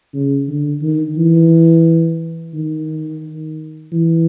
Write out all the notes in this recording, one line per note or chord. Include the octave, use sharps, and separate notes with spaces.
C#3
D3
D#3
E3
D#3
E3